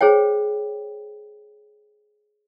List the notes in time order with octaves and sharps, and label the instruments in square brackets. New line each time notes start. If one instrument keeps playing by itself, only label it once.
[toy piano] G#4 C5 C#5 G5